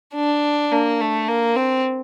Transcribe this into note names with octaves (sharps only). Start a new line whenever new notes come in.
D4
A#3
A3
A#3
C4